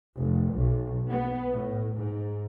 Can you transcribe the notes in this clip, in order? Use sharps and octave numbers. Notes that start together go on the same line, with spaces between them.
F1
B1
B3
A2
G#2